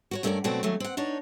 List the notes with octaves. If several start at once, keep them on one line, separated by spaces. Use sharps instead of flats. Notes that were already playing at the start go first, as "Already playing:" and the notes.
F#4 A#4 C#5
G2 A3 C#4 G#4 A#4 D5
B2 F#3 A3 C4 F#4 D5
D#2 F#3 A3 C#4
C4 F#5
D4 D#4 C#5